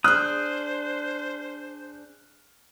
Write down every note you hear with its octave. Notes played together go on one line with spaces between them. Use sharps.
D4 G#4 C5 D#6 F6 F#6